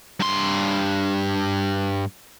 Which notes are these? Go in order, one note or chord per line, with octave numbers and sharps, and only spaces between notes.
G2 C6